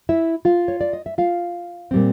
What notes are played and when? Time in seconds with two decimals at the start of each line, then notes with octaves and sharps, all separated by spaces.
0.09 E4 E5
0.45 F4 F5
0.68 C#5
0.81 D5
0.93 D#5
1.06 E5
1.18 F4 F5
1.91 A#2 G3 C4